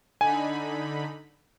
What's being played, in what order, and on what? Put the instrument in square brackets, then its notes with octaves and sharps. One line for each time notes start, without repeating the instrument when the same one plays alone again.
[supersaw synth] D3 D#4 B5 [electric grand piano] G#5